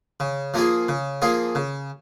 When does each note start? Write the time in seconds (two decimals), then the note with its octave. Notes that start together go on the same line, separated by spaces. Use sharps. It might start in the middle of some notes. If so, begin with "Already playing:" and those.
0.20 C#3
0.54 F3 A#3 F4 G#4
0.89 C#3
1.22 F3 A#3 F4 G#4
1.55 C#3